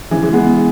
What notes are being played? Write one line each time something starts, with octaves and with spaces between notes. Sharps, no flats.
C#3 E3
E3 G#3
G#3 B3